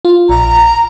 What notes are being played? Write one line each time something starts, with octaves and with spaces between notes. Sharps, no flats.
F4
A#1 A#5